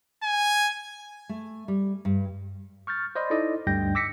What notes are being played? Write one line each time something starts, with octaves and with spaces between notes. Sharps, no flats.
G#5
A3
G3
G2
C#6 F6 G6 A6
C5 D5 D#5 B5 C6
D#4 E4 A4 D5 D#5
D2 G2 G3 G5 G6 A#6
D6 E6 A#6 B6 C#7